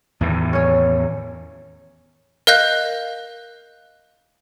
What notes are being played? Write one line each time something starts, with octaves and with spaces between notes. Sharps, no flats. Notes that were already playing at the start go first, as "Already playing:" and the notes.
E2 A2 D#3
C#4 C#5
A#4 D#5 F5 F#6 G6 A#6